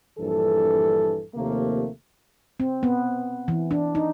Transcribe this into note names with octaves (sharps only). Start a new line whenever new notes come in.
A#1 G2 E3 A4
D#2 C3 F3 A3 A#3
C4
B3
E3
D4
D#4